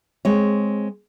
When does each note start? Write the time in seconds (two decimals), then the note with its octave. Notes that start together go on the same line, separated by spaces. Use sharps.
0.25 G#3 C4 C#5